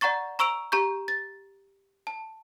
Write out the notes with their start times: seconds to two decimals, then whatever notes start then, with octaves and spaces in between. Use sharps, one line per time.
0.01 D5 F#5 A#5 C#6 A6
0.39 A#5 C#6 E6 D7 F7
0.72 G4 A#5 C#6 G6
1.08 A6
2.07 A5